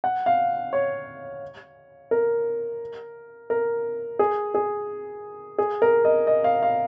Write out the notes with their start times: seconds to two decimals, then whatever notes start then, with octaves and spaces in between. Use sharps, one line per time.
0.04 F#5
0.26 F5
0.73 C#5
2.11 A#4
3.50 A#4
4.19 G#4
4.55 G#4
5.58 G#4
5.82 A#4
6.05 D#5
6.27 D#5
6.44 F5
6.63 F5